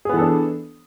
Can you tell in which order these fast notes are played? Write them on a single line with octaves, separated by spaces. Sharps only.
G#4 B3 E3 A4 D4